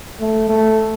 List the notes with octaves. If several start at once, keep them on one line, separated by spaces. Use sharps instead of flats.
A3
A3